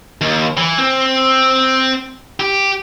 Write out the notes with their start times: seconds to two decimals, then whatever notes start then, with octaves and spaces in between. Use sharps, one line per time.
0.21 D#2
0.57 E3
0.78 C4
2.40 G4